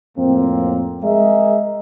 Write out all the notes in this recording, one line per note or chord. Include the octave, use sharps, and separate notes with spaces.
F2 A2 A#3 C4
G#3 G#4 A#4 D#5 E5